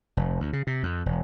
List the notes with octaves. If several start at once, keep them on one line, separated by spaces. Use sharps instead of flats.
F1
D2
C#3
C3
F2
E1